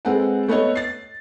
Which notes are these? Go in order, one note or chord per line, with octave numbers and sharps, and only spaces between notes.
G#3 C4 A4 B4 F#5
A3 B3 A4 C#5 D#5
A6 C7